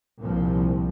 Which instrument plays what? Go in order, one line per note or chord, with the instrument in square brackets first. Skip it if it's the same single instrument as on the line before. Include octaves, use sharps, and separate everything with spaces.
[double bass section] C2 A#2 F3